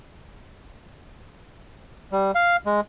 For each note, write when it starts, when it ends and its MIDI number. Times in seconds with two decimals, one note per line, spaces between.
2.12 2.31 55
2.35 2.56 77
2.66 2.80 56